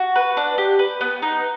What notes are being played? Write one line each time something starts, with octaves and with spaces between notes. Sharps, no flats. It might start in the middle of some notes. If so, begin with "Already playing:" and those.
Already playing: F#4
B4
D4
G4
B4
B3
D#4